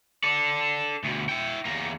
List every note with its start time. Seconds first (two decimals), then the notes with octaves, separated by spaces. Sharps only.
0.23 A4 D5
1.04 D2 B2
1.29 E4 G5
1.65 E2 A#3